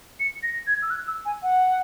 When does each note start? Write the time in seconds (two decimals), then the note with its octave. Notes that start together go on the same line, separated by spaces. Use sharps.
0.20 C#7
0.43 A#6
0.67 G#6
0.83 E6
0.90 F#6
1.08 E6
1.25 G#5
1.43 F#5